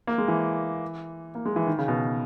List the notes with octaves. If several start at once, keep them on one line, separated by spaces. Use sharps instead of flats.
A#3
G#3
E3
A#3
G#3
E3
D#3
C#3
B2